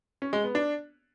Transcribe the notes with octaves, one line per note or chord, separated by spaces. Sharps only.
C#4
G#3
B3
D4